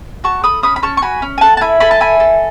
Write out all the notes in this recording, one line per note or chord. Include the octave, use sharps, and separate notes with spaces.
F#4 A5 C#6
A4 B5 D#6
C#4 B5 D#6
B5
C#4 A5 C#6
C#6
F#4 G#5 B5
C#4
G#5
A4 F#5 A5
A5
E4 G#5 B5
A4 G#5 B5
A5
E4 G#5 B5
A4